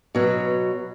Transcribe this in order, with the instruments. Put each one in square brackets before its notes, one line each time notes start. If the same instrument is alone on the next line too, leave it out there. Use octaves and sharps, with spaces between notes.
[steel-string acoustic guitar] B2 F#3